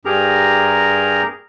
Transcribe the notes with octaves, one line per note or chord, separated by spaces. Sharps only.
G2 G4 G#4 A#4 A#5